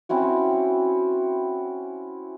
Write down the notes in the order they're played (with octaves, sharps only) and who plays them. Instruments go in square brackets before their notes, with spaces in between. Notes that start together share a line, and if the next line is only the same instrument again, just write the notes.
[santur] C4 C#4 E4 F#4